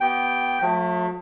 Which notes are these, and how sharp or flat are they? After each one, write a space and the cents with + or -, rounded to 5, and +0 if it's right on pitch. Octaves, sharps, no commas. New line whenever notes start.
B3 +0 G4 -40 G5 +0
F3 +45 A3 +0